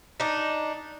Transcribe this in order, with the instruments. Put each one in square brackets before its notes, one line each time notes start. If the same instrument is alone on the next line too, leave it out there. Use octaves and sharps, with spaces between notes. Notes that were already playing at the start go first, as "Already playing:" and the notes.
[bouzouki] D4 D#4